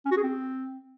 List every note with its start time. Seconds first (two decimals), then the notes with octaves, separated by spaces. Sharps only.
0.05 C#4
0.11 F#4
0.17 G#4
0.23 C4